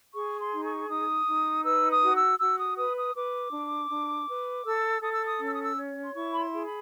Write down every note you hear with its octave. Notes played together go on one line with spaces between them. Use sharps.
G#4 C#6
C6
D#4
C#6
D#4 D#6
D#4
B4 E6
D#6
F#4
E6
F#4 E6
D#6
B4 D#6
D#6
B4 D6
D4
D4
B4
A4 E6
A4 D#6
E6
D#6
C#4
E6
D#6
E6
C#5
C6
E4 C#6
B5
C6
G#4
B5